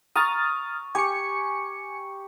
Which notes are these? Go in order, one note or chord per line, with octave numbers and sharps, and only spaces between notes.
A#5 C#6 D#6 F6 A6
G4 G#5 C#6 C#7